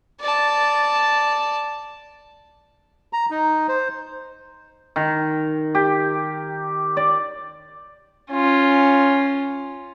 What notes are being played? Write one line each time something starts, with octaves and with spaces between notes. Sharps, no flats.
D5 A5
A#5
D#4
C5
D#3
G4
D5
C#4 F4